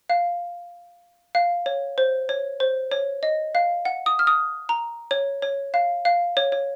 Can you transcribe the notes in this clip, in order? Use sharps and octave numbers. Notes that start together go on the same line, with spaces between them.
F5
F5
C#5
C5
C#5
C5
C#5
D#5
F5
F#5
D#6
F6
D#6
A#5
C#5
C#5
F5
F5
C#5
C#5